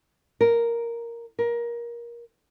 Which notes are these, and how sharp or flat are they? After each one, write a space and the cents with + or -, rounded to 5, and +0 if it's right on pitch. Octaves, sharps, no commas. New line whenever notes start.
A#4 +0
A#4 +20